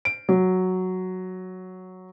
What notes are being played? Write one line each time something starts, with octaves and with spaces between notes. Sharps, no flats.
D7
F#3